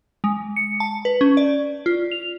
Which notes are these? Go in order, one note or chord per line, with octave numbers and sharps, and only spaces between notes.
G#3
C#7
A5
B4
C#4
D5
F4
F7